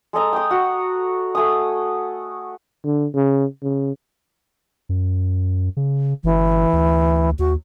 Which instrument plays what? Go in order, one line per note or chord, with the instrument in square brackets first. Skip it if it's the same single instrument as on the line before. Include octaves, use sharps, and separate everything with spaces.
[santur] G#3 A4 D#5 A#5
G5 D#6
F#4
A3 G#5 D#6
[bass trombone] D3
C#3
C#3
[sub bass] F#2
C#3
[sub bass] G1 [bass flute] E3
[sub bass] D2
[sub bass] D#2 [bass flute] F#4